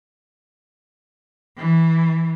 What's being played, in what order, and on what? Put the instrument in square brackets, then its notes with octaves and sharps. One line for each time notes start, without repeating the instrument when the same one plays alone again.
[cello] E3